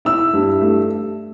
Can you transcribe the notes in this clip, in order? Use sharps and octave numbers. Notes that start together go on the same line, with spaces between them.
E4 E6
G2
A3